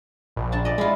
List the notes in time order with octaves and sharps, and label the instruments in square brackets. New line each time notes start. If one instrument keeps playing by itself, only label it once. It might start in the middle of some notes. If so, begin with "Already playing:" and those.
[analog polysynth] A#1
[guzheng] D4 A5
D5 D#5
[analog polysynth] G#3 [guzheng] E4 F4